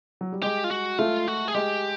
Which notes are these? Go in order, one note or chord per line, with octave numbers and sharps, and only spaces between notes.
F#3
G3
G#3 G4
F4
F#4
A3 F4
F#4
G#4
G#3 G4